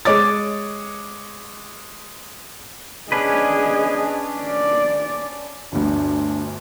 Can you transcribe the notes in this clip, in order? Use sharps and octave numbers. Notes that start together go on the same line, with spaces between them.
G#3 C#5 D6 A6
C#4 D4 G#4 B4 D#5
D5
G1 D2 D4